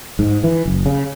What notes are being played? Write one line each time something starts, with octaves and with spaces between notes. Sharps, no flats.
G#2
E3
F#1
C#3